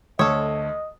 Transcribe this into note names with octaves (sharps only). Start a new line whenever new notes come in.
D2 A4 C#5 D#5 D#6